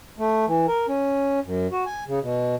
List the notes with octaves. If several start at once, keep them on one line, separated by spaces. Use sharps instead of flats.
A3
E3
A#4
C#4
F#2
F#4
G#5
C#3
B2